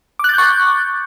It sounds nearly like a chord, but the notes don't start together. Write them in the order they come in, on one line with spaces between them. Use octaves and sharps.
D6 F#6 A6 G6 C#6